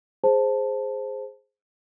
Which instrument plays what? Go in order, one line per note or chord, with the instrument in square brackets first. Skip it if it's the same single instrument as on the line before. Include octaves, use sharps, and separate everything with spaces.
[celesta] G#4 C5 A5